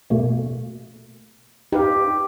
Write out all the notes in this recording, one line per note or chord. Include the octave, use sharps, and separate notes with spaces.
B2 A3 A#3
D#4 G4 B4 F5